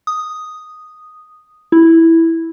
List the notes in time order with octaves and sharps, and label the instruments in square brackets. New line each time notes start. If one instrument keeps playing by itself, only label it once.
[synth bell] D#6
E4